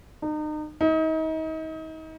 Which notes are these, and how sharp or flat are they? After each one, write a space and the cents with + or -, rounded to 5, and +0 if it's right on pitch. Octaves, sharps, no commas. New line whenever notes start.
D#4 -35
D#4 +35